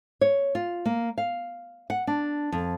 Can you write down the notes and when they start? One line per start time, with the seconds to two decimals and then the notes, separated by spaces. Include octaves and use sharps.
0.21 C#5
0.55 F4
0.85 A#3
1.18 F5
1.90 F#5
2.07 D4
2.52 F2